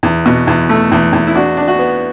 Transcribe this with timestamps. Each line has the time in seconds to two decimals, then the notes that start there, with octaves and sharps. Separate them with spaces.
0.03 E2
0.26 B2
0.47 E2
0.69 A3
0.92 E2
1.13 E2
1.27 E4
1.35 D4 F#4
1.57 D4
1.68 F#4
1.79 B3